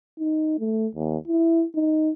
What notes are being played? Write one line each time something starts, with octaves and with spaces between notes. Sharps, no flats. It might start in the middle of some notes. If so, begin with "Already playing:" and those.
D#4
A3
D#2
E4
D#4